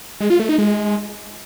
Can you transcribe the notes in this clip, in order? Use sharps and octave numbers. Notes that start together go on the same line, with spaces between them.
G#3
F4
A3
D#4
G#3